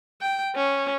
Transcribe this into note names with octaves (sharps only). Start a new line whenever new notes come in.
G5
C#4